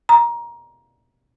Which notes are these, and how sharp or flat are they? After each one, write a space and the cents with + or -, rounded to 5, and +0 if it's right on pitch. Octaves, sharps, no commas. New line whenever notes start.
A#5 +20